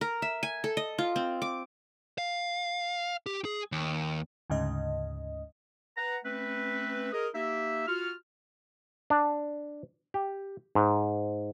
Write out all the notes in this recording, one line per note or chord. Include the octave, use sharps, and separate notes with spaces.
A#4
E5
G#5
A4
D#5
F4
C4
D6
F5
G4
G#4
D#2
D2 G#2 C#3 D#5
B4 F#5 A#5
A3 C4 C#4 B4
G#4 A#4 D#5
A#3 D#4 G4 E5
F4 F#4 F6
D4
G4
G#2